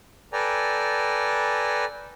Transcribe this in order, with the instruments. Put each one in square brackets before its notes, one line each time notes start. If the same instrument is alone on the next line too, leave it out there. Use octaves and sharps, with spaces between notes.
[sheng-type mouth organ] A4 B4 D5 G5 G#5 A#5